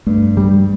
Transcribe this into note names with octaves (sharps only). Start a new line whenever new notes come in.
G2 A3
G3